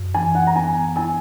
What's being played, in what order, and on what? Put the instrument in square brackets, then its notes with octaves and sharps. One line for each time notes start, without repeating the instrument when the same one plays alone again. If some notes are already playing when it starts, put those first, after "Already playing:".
Already playing: [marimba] F#2
[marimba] E3 [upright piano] G#5
[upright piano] F#5
A#5
[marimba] B3 [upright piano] G#5
[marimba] E4 [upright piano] G#5